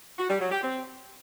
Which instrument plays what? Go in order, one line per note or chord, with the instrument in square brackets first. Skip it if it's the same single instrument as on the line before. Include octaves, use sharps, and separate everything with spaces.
[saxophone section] F#4
G3
F#3
G4
C4